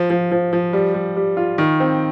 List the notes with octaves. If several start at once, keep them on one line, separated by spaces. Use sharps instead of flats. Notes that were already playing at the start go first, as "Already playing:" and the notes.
Already playing: F3
F3
F3
F3
G3
G3
G3
F4
D#3
C4